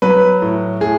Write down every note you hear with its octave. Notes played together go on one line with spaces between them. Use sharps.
F#3 B4
A2
A2 G#4